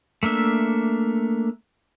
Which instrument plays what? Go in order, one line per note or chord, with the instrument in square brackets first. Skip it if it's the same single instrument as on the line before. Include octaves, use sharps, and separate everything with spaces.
[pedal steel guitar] A3 A#3 D4 E5